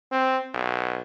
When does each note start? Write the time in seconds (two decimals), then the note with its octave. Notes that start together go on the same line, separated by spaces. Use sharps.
0.12 C4
0.54 B1